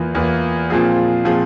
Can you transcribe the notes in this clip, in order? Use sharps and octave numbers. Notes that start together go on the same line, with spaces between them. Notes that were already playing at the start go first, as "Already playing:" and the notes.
Already playing: E2 E3 A#3 F4
E2 E3 A#3 F4
A#2 F3 C4 F4 G#4
A#2 F3 C4 F4 G#4